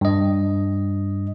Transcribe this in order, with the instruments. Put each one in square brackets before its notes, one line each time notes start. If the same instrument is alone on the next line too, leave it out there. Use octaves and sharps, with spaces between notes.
[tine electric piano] G2 D#5